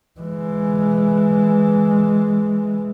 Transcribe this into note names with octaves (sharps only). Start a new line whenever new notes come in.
E3 G#3